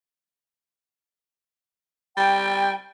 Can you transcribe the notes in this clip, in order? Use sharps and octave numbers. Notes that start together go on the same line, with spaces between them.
G3 G5